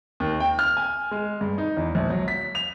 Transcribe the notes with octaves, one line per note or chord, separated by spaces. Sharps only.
D#2
G5
F6
G#5
G#3
G2
D#4
E2
A#1
F#3
B6
F7